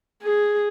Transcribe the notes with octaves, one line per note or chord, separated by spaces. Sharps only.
G#4